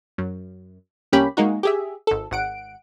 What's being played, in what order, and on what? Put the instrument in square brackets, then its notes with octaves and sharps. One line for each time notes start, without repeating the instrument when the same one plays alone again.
[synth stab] F#2
C2 A#3 C#4 G4 B5
G#3 A#3 D#4 F#4
G4 G#4 E5
G#1 A4
G#1 F#5 D7